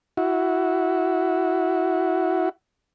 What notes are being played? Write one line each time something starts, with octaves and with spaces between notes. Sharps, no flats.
E4 F#4